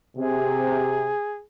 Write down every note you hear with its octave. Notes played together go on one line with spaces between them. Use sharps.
C3 G#4